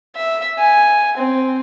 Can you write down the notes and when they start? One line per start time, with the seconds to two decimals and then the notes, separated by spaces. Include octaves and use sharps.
0.16 E5
0.59 G#5
1.17 C4